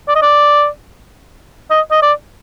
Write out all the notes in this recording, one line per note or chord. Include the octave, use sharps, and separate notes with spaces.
D5
D#5
D5
D#5
D#5
D5